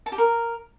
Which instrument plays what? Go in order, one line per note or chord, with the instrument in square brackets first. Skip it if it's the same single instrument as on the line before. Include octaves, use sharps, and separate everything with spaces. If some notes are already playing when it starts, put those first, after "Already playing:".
[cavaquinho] A5
G4
A#4